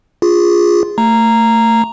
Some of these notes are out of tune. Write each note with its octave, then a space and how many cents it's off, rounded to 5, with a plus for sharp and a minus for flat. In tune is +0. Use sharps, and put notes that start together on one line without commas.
F4 +0 G#4 -15
A3 +25 A#5 -5